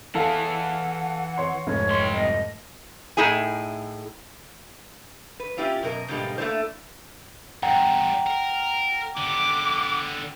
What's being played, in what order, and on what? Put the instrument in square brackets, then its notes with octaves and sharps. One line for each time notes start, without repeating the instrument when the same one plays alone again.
[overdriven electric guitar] E3 G#4 [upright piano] A4 F5 [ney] F#5
[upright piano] C#5 C6
[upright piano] F1 G#2 [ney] C#5
[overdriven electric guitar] C2 C6
[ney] D#5
[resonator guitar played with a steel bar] A2 D#4 E4 G#4 G#5
B4
A#3 C#4 E4 F4 G4
F#2 B2 A#4 D#5
G#2 B2 D3 G3 G#3 A#3
A3 A#3 D4 E4 C5
[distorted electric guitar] E2 G2 [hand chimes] F#5 G5 A#5
[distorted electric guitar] A#4
[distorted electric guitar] D3 B3 [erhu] D6